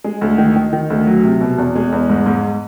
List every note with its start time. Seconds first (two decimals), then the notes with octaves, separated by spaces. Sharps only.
0.04 G#3
0.21 D2
0.38 D#3
0.56 D#3
0.73 D#3
0.90 D2
1.07 F#3
1.24 C3
1.41 B2
1.58 E2
1.75 G#3
1.92 E2
2.09 G#2
2.26 G#2